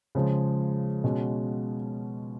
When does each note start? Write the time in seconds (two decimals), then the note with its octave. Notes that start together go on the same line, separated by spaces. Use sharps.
0.15 C#3 F3 G#3
1.04 B2 G#3 C#4 F#4